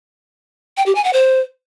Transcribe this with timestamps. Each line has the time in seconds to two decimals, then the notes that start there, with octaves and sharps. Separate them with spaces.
0.77 G5
0.86 G4
0.95 G#5
1.04 F#5
1.13 C5